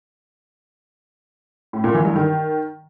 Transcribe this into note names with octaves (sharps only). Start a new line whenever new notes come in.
A2
A#2
E3
G2
D#3